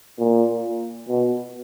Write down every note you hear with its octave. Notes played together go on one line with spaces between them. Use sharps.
A#2
B2